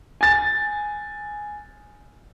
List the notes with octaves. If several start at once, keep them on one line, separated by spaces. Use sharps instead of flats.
G#5 A6